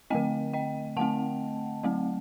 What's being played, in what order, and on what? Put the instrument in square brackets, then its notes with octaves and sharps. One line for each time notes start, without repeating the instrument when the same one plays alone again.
[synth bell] D3 A3 C4 D#5 G5
D#5 G5
D3 A3 C4 F#5 A5
F#3 A3 C4